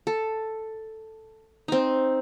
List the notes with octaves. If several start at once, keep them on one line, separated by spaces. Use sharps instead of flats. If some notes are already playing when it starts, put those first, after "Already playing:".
A4
C4 D#4